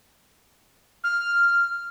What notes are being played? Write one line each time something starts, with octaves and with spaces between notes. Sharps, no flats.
F6